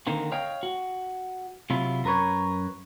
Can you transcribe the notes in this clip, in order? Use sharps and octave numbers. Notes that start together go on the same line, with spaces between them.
D3 D#3 A#3 C4
C#5 D#5 F5 G5
F#4
C3 F#3 E4 F4
F#2 A#4 B4 C#5